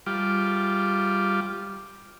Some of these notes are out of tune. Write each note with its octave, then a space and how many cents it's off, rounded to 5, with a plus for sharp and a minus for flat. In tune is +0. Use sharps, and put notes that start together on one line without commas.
G3 +0 F4 +0 D6 +0